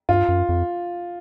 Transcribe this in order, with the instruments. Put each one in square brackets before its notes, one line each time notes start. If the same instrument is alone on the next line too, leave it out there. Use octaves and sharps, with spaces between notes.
[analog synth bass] G2 [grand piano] F4
[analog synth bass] F#2
F2